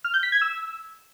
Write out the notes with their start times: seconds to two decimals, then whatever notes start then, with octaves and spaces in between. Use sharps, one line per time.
0.04 F6
0.14 G6
0.23 B6
0.32 G#6
0.41 E6